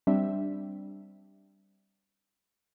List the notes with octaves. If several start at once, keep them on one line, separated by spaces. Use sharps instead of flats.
G3 C4 D4 E5